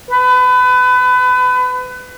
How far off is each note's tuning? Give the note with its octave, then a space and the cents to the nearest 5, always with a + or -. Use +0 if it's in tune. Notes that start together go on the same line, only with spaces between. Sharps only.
B4 +25